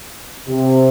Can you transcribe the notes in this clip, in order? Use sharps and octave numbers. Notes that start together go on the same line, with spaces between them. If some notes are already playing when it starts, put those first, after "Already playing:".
C3